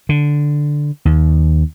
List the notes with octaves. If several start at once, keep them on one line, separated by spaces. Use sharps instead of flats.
D3
D#2